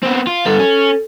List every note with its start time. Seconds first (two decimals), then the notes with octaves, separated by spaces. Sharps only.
0.03 B3 C4
0.27 F4
0.46 G2 B3 A4
0.60 C#4